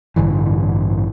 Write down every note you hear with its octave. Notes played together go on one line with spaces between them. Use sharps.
A1 G2 D3 E3